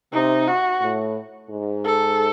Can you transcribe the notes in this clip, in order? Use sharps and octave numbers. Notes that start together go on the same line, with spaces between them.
C3 D#4
F#4
A2
G#2
A4